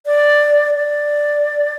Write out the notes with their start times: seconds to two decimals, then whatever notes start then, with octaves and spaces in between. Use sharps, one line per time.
0.06 D5
0.74 D5